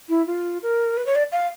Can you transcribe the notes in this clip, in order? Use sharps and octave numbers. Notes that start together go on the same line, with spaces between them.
E4
F4
A#4
B4
C#5
D5
F5